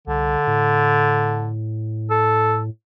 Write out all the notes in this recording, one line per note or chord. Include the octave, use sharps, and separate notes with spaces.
C2 D3
A2
A4